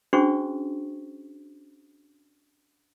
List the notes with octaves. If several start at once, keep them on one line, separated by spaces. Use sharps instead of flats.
C#4 D4 F#4 G#4 C5 C#6